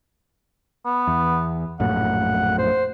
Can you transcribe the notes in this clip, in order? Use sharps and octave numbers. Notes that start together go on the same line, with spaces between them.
B3
E2
A#1 F#2 A2 F#5
C5